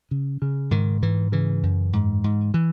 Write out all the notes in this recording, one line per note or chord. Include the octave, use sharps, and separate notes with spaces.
C#3
C#3
G#2 D#3
G#2 E3
C#3 E3
F#2
G#2
G#2
E3